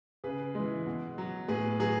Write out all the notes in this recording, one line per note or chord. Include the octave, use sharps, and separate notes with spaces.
C#3 G#4 B4
E3 G#3
B2
F#3
A2 G#4 B4
F#3 G#4 B4